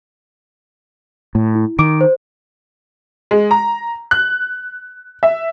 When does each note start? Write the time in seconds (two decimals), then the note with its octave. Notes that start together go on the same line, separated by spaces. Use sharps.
1.35 A2
1.55 E4
1.79 D#3 D6 D7
2.01 C5
3.31 G#3
3.51 A#5
4.11 F#6
5.23 E5